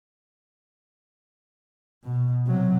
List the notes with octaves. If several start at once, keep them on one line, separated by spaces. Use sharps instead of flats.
B2
C3 F#3